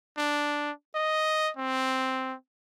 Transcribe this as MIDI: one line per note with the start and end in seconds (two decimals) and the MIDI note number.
0.18 0.71 62
0.95 1.50 75
1.57 2.35 60